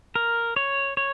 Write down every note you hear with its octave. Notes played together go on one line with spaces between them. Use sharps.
A#4
C#5
C#5